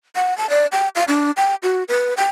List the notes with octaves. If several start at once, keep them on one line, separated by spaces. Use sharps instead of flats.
F#5
A5
D5
G5
F5
D4
G5
F#4
B4
G5